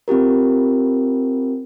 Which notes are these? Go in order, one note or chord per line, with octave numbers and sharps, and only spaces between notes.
C4 F4 G4 A#4